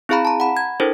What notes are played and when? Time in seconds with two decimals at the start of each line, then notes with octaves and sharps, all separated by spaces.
0.09 C4 E4 G#4 F5 A#5 B5
0.25 A5 A#5
0.40 F#5 B5
0.57 G#6
0.80 D4 E4 A4 A#4 C5